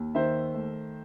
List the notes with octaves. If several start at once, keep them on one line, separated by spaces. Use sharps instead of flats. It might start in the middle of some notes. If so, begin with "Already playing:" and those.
Already playing: D#2
D#3 C5 E5
A3